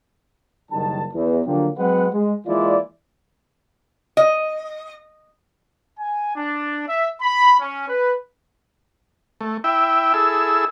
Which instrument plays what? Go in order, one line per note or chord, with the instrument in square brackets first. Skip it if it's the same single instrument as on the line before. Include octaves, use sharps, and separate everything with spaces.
[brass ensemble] F#1 D#3 G3 A5
E2
D3 F3 F#3 A#3 D4 G4
F#3 G#3 C4 B4 F#5
G#3
E3 G#3 A#3 E4 F4 D5
[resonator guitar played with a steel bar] D#5
[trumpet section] G#5
D4
E5
B5
C#4
B4
[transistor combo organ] A3
E4 E5 G5
E4 G#4 A4 E6